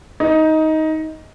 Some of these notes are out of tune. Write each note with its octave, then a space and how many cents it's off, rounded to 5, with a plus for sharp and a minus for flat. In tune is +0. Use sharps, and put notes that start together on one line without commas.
D#4 +15